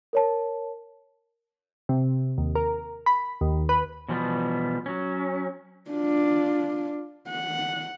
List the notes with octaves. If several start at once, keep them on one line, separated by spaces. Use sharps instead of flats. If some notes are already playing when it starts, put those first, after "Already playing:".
A#4 C#5 A5
C3
D#2
A#4
B5
D#2
B4
B2 E3 F3 G3 A#3 B3
F#3 C#4
D4 F4
F#5